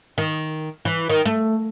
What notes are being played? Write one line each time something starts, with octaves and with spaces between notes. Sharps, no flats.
D#3
E3
D#3
A3